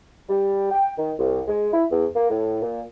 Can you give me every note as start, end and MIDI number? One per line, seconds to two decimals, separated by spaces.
0.29 0.70 55
0.71 0.91 79
0.98 1.12 51
1.19 1.41 36
1.48 1.69 56
1.73 1.85 64
1.91 2.06 40
2.16 2.28 58
2.29 2.58 45
2.62 2.82 46